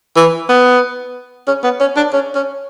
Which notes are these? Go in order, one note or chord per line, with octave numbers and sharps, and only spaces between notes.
E3
B3
C#4
B3
C#4
D4
C#4
C#4